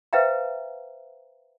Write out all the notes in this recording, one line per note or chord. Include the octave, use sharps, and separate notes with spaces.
B4 C5 E5 F5 G5 A#5